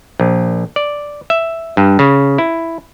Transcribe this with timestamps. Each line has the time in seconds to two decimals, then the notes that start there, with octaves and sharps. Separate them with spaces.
0.20 A#1
0.76 D5
1.30 E5
1.77 G2
1.99 C#3
2.38 E4